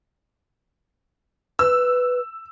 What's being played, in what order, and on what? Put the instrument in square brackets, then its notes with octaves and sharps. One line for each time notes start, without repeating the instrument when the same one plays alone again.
[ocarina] B4 [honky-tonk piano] E6